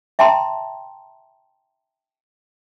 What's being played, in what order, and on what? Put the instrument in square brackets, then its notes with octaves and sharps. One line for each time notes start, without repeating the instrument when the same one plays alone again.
[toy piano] E5 G5 A5 A#5 C6